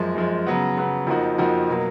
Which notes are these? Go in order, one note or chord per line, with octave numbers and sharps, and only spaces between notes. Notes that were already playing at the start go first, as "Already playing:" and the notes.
Already playing: F#2 F3 G#3
F#2 F3 G#3
C#3 F#3 B3
C#3 F#3 B3
F2 F3 A#3 D#4 F#4
F2 F3 A#3 D#4 F#4
B2 F#3 A#3